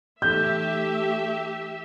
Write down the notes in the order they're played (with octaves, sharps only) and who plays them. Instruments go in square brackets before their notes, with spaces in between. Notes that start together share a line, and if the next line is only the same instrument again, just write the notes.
[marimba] E3 D#4 A4 [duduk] A3 [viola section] G4 E5 [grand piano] G6